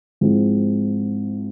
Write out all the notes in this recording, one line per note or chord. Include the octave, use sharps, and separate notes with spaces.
G#2 F3 G#3 C4 E4